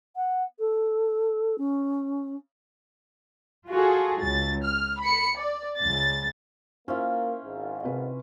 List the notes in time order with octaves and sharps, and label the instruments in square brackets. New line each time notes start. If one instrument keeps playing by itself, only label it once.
[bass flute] F#5
A4
C#4
[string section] F4 F#4 G#4 A4
C#2 A6
F6
B5 C#7
D5
C#2 A6
[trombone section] A#3 [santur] C#4 E4 F4 [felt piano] C5
[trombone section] G#1 G#2
[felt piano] C3 B4